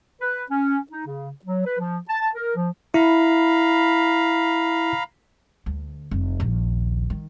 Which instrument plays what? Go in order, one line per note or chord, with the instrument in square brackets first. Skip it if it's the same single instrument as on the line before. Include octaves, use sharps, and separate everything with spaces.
[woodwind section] B4
C#4
D#4
C#3
F#3
B4
F3
A5
A#4
F3
[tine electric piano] E4 [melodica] F5 A#5 B5
[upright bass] D2
F1
A#1 D#2
D#3